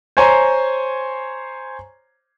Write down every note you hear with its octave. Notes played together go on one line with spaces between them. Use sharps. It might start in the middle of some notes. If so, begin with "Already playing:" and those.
C5 C#5 G#5 A#5 C6